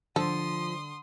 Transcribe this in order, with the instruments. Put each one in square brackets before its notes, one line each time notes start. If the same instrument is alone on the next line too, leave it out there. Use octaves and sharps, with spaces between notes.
[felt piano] D3 [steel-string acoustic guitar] F3 [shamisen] A4 [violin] C6 D#6